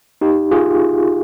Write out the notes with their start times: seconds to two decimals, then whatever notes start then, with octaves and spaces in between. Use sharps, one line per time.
0.21 D#4 G4
0.51 F4 G#4